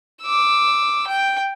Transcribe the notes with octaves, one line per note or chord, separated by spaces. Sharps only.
D6 E6
G5